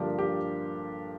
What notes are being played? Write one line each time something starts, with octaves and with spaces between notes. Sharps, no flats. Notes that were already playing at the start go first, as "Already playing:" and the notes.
Already playing: G2 D3 F3 A#3 D4 G4
G4